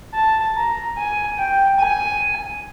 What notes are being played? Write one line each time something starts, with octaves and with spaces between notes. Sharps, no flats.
A5
A#5
G#5
G5
G#5